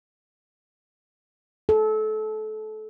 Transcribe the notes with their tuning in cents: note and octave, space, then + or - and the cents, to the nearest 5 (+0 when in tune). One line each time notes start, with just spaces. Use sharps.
A4 -25